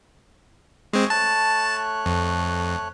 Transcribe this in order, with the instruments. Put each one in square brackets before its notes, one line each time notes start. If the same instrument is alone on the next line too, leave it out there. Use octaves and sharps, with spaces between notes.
[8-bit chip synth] G#3 C4 [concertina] G#5 C#6
[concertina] A3 C#5 F#6 [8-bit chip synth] A5
[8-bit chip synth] F2